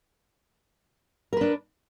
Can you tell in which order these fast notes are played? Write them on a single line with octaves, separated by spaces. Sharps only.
A#4 B4 D4